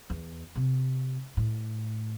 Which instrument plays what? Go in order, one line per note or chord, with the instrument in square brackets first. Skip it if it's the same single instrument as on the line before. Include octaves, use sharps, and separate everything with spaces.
[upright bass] E2
C3
A2